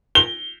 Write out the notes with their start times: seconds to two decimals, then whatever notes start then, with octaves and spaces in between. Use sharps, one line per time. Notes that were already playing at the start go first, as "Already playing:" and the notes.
0.15 G7